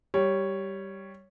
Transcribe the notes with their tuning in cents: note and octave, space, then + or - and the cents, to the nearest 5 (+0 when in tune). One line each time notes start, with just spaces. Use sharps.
G3 +0 C#5 +0